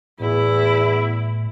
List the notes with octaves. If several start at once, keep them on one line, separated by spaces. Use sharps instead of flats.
E2 A2 E4